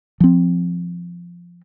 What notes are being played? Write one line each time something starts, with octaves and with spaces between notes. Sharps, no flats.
F3 C4